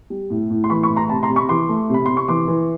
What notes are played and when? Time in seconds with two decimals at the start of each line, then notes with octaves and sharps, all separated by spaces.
0.10 G3
0.30 A2
0.50 A2
0.64 C6
0.70 E3 B5 C#6
0.83 B5 C#6
0.89 A2
0.96 A#5 C6
1.09 C3 A5 B5
1.23 A#5 C6
1.30 C3
1.36 B5 C#6
1.49 E3 C6 D6
1.69 A3
1.89 C3 B5
2.06 C3 C6
2.17 C#6
2.28 E3 C6 D6
2.48 E3